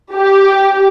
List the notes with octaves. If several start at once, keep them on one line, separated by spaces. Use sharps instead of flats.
G4